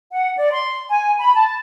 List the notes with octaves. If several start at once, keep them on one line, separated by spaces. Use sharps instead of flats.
F#5
D5
C6
G#5
B5
A5